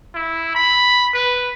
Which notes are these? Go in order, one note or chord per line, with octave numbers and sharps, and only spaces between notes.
E4
B5
B4